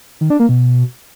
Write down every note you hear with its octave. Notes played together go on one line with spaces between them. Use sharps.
D#3
D4
A#3
B2